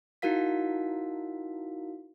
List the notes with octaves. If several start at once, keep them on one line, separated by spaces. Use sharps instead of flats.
D#4 E4 F#4 A#4 F5 B6